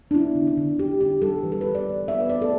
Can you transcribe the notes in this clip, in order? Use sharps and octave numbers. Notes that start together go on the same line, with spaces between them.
D4
B3 E4
D3
D4
D3
D3 G4
D3 G4
G3 A4
E3 B4
A4
E3 B4
D5
E3
B3 E5
B4
B3 D5
A4